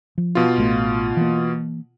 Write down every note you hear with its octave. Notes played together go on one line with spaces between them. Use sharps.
F3
B2 F4
A1 A3
E3 A#3